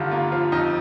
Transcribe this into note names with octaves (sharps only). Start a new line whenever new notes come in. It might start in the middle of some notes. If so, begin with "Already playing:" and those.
Already playing: G2 D3 D#3 F4
A#3 F4
F3 F4
F2 D#4